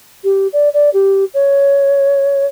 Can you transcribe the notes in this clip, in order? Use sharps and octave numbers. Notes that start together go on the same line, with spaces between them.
G4
D5
D5
G4
C#5